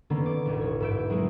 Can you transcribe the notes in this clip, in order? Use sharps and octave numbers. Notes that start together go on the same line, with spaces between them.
D3 D#3 A#3 B3 C#4
D5 D6
E1 A1 G#4
C#5
G#2 B4 E5 G6 D7
F#3 G#3 A#3 C#4 G#4